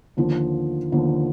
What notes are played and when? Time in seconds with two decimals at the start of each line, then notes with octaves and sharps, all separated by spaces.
0.17 D#2 D3 F3
0.92 D#2 D3 F3